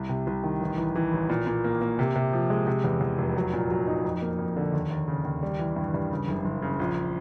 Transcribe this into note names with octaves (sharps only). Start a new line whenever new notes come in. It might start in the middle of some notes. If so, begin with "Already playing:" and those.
Already playing: C2
C3
C2
D#3
A1
E3
E3
A1
A#2
A#2
A#3
A#3
C3
C3
F3
G#3
C3
E2
E2
F1
F#3
A#2
F#3
D#4
F2
A#3
F2
D3
D#2
D#2
C#3
D#2
G3
E3
G2
G2
C#3
F#1
F#1
C#3
A#1